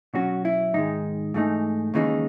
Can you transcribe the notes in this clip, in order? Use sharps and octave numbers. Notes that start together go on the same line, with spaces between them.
B2 F#3 C#4 F#4
E4
G#2 D#3 G#3 D#4
G#2 E3 A3 D#4
D#2 C#3 E3 G#3 D#4